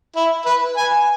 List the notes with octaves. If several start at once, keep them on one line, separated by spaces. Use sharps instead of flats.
E4
B4
G#5